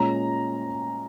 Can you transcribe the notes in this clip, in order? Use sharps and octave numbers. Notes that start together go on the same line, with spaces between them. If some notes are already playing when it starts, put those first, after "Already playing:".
Already playing: A#2 G#3 C#4 A#5